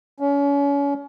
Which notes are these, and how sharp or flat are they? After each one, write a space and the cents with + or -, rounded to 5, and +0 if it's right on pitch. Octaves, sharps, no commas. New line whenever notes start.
C#4 +35